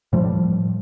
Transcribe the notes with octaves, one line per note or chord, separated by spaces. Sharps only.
A2 F3 G3